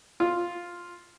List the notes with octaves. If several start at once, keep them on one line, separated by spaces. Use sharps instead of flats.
F4